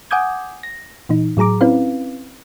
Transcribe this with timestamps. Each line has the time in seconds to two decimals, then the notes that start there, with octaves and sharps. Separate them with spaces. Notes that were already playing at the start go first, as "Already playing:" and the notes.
0.11 F#5 G#5 D6 D#6 G6 G#6
0.63 A#6
1.09 A#2 E3 D#4
1.37 A2 F#3 G#4 A#5 D6
1.61 C4 C#4 E4 B4 F5